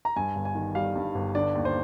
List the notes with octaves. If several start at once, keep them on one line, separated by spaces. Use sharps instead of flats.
A#5
G2 G#5
G1
G#5
D#3
G3 F5
G2
G1
D3 D5
D#2
C5